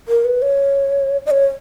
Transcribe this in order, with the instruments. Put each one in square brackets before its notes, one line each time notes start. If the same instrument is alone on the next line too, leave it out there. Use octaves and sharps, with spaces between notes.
[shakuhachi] A#4
B4
C#5
D#5
C#5